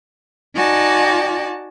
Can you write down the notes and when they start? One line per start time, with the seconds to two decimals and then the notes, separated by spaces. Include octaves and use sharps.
0.55 D#4 F#4 D5 G#5 A5